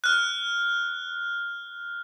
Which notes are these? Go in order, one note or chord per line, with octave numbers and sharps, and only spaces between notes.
F6 F#6